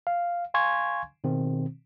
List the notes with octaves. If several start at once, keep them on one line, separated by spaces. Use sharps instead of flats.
F5
F5 G#5 C6 C#6 G#6
B2 D#3 C4